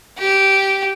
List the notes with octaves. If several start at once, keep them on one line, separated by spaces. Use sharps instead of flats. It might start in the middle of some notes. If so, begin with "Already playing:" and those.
G4